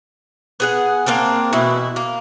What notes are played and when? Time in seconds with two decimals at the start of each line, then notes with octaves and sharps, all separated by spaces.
0.60 B3 G#4 F#5
1.06 A#3 C4 D4 A#4
1.53 B2 E3 E4
1.96 A#3